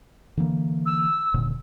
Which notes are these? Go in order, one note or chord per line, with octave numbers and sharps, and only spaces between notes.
D3 E3 A#3
E6
D#1 A#2 D3